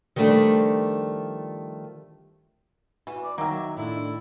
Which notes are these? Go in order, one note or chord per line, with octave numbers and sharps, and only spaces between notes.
D#3 F3 G3 A3 D4
E3 F#4
D5
D#3 F#3 A#3 E5
A2 D4 E4 F4